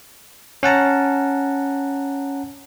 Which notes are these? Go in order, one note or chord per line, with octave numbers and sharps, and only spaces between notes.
C#4 F#5 A5 A#5